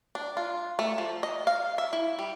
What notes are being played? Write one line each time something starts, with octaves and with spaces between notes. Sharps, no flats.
D4
F4
A3
F3
D#5
F5
E5
E4
G3